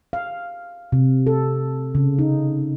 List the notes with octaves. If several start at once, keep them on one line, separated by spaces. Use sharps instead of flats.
F5
C3
A4
C#3
D#4